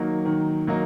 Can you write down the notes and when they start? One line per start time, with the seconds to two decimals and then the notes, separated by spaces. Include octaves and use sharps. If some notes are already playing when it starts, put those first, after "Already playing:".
Already playing: D#3 F#3 A#3 D#4
0.25 D#3
0.67 F#3 A#3 D#4